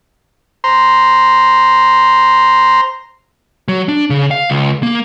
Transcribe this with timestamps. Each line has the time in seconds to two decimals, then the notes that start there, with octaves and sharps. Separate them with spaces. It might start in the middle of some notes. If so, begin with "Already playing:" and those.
0.64 C5 A#5 C6
3.68 F#3
3.88 D4
4.10 C#3
4.31 F5
4.50 C#2
4.83 A#3